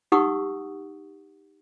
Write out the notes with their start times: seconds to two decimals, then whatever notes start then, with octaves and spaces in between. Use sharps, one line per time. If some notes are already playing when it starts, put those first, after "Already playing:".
0.12 D#4 G4 F#5 C#6 D#6 E6